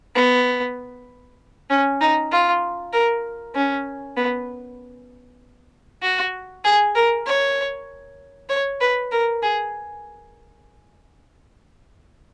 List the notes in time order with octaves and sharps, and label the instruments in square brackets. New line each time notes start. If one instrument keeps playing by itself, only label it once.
[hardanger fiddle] B3
C#4
D#4
F4
A#4
C#4
B3
F#4
G#4
A#4
C#5
C#5
B4
A#4
G#4